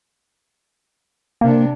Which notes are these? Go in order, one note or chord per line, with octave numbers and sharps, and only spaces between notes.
C3 A#3 D4